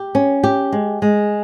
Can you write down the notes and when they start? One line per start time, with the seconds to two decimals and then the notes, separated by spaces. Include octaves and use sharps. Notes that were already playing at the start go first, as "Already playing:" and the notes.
Already playing: G4
0.15 C#4
0.44 G4
0.72 G#3
1.02 G#3